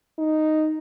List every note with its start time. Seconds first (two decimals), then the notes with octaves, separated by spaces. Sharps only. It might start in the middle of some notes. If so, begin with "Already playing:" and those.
0.19 D#4